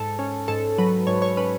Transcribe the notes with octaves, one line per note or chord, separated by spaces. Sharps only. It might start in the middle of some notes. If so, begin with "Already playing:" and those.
Already playing: G#2 A4
C#4
G#2 A4
F#3 B4
G#2 C#5
C#5
C#4 B4